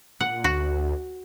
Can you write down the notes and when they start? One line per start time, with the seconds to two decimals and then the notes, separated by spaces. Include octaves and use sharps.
0.20 A#2 F#5
0.44 D2 F#4